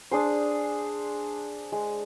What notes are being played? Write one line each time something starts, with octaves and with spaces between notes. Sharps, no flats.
D4 G#4 C5
G#3